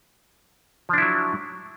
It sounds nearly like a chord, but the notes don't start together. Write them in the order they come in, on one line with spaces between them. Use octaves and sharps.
F3 D4 E4 F#3